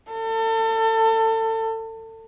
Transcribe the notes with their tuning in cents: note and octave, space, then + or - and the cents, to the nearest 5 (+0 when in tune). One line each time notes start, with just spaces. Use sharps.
A4 +30